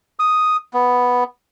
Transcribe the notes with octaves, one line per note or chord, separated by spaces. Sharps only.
D#6
B3